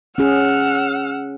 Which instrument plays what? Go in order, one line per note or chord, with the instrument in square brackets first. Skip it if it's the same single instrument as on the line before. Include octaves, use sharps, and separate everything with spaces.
[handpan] C#4 G#4 [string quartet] F#5 E6 F6